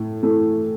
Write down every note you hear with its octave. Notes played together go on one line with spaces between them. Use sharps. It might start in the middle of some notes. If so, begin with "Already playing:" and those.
Already playing: A2
E3 A3